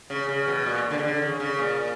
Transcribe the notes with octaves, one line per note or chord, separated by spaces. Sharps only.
C#3
C#3
B2
A#2
B2
D3
C#3
D3
C#3
C#3
A#2